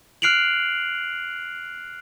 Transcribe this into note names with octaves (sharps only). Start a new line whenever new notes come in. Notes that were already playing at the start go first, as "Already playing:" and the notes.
F6 F#6 C7 D7 F7 F#7